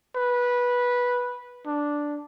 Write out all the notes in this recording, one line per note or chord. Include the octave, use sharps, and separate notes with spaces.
B4
D4